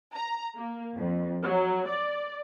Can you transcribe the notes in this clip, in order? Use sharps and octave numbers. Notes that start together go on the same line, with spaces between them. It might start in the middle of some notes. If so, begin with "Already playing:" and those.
A#5
A#3
F2
F#3
D5